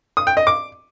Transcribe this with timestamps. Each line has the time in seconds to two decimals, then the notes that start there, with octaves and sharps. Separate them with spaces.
0.17 D#6
0.27 G5
0.37 D#5
0.47 D6